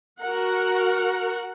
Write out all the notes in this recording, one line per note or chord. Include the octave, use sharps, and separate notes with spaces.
F#4 A#4 F#5